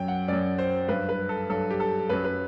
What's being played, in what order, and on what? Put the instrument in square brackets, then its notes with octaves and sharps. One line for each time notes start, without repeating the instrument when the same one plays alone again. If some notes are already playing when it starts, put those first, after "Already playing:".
Already playing: [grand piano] F#2 F#3 G5
F#5
F#2 F#3 D5
C5
G2 F#3 B4
B4
A4
G2 F#3 A4
G4
A4
F#2 F#3 B4
B4